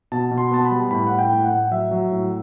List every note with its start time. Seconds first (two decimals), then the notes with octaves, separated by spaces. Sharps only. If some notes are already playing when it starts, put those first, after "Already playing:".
0.12 B2 A5
0.31 B2
0.38 C6
0.51 B3 A5
0.65 B5
0.71 G3
0.91 A2 B5
1.07 A2 F#5
1.19 G5
1.32 A2
1.44 F#5
1.52 A2
1.71 F#3 E5
1.91 F#3
2.12 A2